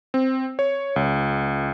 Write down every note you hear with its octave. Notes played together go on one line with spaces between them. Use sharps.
C4
C#5
C#2